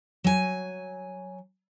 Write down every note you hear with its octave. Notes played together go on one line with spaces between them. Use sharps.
F#3 G#5